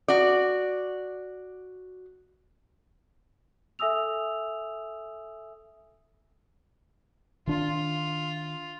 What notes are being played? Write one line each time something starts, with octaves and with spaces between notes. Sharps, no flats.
F#4 D5
A4 E5 G#5 D#6 E6 F7
D#3 D4 F4